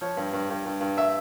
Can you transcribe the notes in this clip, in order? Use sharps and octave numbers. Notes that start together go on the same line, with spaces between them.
F3 C#5
G2
G2
G2
G2
G2
E5